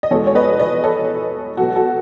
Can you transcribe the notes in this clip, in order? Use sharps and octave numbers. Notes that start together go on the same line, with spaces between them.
D#5
E2 B2 G#3 A4 C#5
C#5
B4 D#5
B4 D#5
A4 C#5
B2 F#3 F#4 A4
F#4 A4